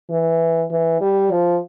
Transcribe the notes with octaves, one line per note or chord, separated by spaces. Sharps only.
E3
E3
G3
F3